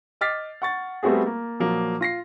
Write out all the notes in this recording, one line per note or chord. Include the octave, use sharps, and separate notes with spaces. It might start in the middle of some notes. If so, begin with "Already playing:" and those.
D#5 D6 F6 A6 B6 C7
F#5 C#6 A6
G3 A3 B3 C4 F#4 G#4
A#3
A#2 F3 F#3 A#3
F4 A#6 C7